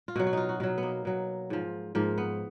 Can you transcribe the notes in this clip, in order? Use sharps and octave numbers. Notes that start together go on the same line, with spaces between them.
F4
B2 F#3 F#4
F#4
D#4 F4
F#4
B2 F#3 F4
B3
A#3
B2 F#3
G#2 F3
G#2 F3 A#3
B3